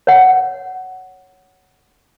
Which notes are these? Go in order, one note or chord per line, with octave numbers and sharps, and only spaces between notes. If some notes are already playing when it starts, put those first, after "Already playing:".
C#5 F#5